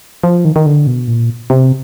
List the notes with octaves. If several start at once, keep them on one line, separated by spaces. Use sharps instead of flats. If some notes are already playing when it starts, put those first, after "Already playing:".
F3
D#3
D#3
D3
B2
A#2
C3